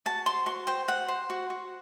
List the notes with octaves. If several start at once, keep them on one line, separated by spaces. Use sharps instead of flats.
F#4 A5
C5 C6
F#4 C6
C5 G5
F#4 F#5
C5
F#4
F#4